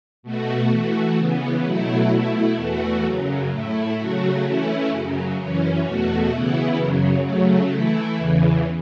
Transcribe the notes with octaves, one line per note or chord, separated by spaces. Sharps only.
B2 A3 F#4
E3 A3 F#4
C#3 E3 B3
B2 F#3 A3 E4
B2 A3 E4
E2 E3 A3 F#4
F#2 C#3 F#3
A2 A3 E4
C#3 F#3 A3 F#4
E3 A3 C#4 E4
F#2 C#3 F#3
F#2 E3 C#4
E2 B2 A3 F#4
C#3 E3 B3 E4
F#2 C#3 F#3
C#3 F#3 A3
E3 A3 E4
E2 C#3 E3